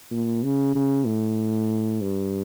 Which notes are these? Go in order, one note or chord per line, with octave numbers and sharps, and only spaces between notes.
A#2
C#3
C#3
A2
G2